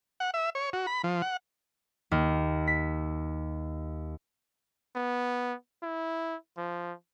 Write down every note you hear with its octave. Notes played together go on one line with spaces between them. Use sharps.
F#5
E5
C#5
F#4
B5
F3
F#5
D#2
B6
B3
E4
F3